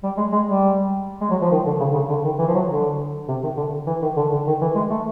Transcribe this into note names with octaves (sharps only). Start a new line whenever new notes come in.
G3
G#3
G#3
G3
G#3
F#3
F3
D#3
D3
C#3
D3
C#3
D3
D#3
E3
F3
F#3
D3
C3
D#3
D3
E3
D#3
D3
D3
D#3
E3
G#3
A3